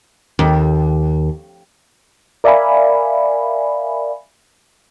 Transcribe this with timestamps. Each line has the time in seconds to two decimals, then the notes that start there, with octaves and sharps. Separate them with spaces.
0.39 D#2
2.44 A#4 D5 E5 F5 G#5 B5